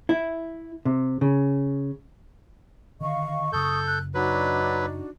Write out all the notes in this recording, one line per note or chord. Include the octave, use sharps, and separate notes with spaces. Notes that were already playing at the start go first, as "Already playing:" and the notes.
E4
C3
C#3
D3 D#3 D#5 F5 C#6
F#2 C#3 A4 C#6 D#6 G6
F#6
F#3 D4 D#4 F#4 B4